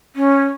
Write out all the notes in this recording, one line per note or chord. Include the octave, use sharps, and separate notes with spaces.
C#4